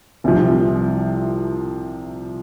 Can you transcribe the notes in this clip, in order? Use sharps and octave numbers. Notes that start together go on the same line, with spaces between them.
C2 C3 F3